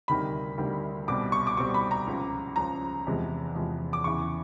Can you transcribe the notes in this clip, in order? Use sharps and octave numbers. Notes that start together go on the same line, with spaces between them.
D2 C3 D#3 G3 B5
D2 C3 D#3 G3
C2 B2 G3 C4 D6
C#6
D6
C2 B2 G3 C4 C#6
B5
A#5
C#2 C#3 F3
C#2 C#3 F3 A#5
E2 C3 F3 G#3
E2 C3 F3 G#3
D6
E2 C#3 E3 C#6